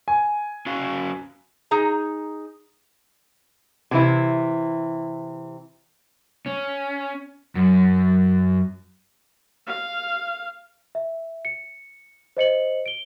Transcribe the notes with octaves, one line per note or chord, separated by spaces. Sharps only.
G#5
C#4 F#4 F5
D#4 G#4 A#5
C3 E3 E4
C#4
F#2
F5
E5
C#7
C5 D#5 C#7 F#7
D7 G7